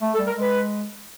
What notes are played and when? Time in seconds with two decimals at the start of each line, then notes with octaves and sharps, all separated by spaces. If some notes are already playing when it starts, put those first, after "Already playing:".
0.02 A3
0.14 A4
0.19 G3
0.27 A#4
0.36 G#3 B4